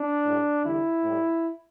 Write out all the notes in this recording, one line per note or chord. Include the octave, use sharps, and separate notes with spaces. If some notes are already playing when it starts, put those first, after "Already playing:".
Already playing: D4
A2 G3
E2 D3 G3 E4
A2 G3